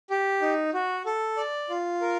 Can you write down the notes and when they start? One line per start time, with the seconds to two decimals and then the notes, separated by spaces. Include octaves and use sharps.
0.10 G4
0.42 D#4
0.74 F#4
1.06 A4
1.37 D5
1.69 F4
2.01 A#4